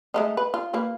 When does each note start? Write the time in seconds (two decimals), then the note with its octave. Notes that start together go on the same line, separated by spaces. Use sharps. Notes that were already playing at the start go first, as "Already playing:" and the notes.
0.14 G#3 A3 D#4
0.37 B4
0.54 F4
0.73 A#3 F4 B4